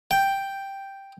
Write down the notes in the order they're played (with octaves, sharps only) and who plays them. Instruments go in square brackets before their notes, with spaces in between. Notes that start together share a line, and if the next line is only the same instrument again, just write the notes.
[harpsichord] G5